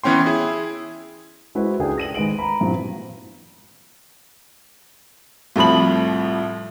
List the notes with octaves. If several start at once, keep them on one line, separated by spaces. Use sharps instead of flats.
E3 B3 C#4 G5 C6
E4 G#4
G#3 E4 F#4 B4 C5
C#2 D4 G#4 A4 G5
A#6 D#7 F#7
G#1 G#3 B4 G#5 D7 F#7
A#5 B5
G2 A#2 E3 F#3 G3 C4
C2 A2 F3 B5 F#7